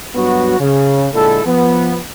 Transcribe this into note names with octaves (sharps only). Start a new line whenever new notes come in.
G2 F#3 B3 F#4
C#3
A#2 D3 G#3 E4 A4
F3 B3